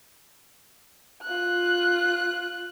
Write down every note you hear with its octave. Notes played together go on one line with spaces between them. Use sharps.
F4 F#6